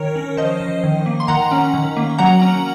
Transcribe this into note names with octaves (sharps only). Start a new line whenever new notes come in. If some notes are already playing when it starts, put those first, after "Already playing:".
Already playing: D#3 A#4 C#5
C#4
F3 C5 D#5
F3
D#3
A#3
C6
D#3 F#5 A#5
C#4
D#3
A#3
F#3 F#5 A#5
C#4